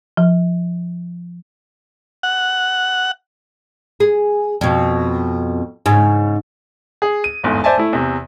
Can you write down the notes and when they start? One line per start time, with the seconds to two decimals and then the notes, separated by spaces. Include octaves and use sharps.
0.17 F3
2.23 F#5
4.00 G#4
4.61 F2 B2
5.86 G#2 C#3
7.02 G#4
7.24 D#7
7.44 G1 E2 G#2
7.64 C5 D5 E5 G#5 A5
7.78 A3 E4
7.93 E2 C3